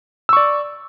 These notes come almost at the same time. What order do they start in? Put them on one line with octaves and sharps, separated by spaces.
E6 C#6 D5